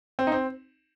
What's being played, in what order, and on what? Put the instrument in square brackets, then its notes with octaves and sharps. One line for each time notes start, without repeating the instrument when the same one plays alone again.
[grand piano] C4
D#4
C4